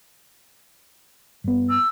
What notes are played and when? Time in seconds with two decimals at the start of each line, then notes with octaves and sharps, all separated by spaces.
1.44 G2 B3
1.69 E6